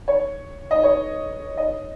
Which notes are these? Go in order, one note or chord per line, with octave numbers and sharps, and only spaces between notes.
C#5
D#5
C#5
D#5